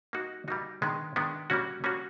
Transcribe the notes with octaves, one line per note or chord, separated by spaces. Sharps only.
G3 A#3 D#4 F#4
G3 A#3 D#4 F#4
D#3 G#3 B3 D4
D#3 G#3 B3 D4
G3 A#3 C#4 F#4
G3 A#3 C#4 F#4